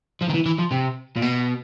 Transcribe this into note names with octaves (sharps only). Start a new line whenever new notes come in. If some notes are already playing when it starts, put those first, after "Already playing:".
F3
D#3
E3
E3
F3
C3
A#2
B2